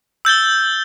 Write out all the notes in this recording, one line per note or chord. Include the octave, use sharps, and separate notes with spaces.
E6 G6 A6 G7